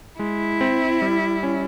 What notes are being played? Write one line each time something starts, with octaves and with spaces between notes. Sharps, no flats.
G#3 E4
C4
G3
C#4